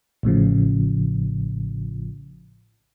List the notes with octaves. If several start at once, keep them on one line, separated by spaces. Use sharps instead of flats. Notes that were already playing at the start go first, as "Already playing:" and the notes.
A1 A2 C#3 F3